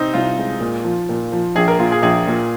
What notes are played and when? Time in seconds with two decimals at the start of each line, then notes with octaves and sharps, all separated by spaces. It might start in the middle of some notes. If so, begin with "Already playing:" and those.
Already playing: C3 C4 D#4
0.14 C2 F4
0.38 G#3
0.61 A#2
0.84 F3
1.09 A#2
1.32 F3
1.56 A#1 G#4
1.68 A#4
1.79 A#2 F4
1.92 G#4
2.02 A#1 G#4
2.27 A#2